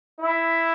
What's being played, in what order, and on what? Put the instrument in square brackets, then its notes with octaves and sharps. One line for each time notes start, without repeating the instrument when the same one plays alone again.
[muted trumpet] E4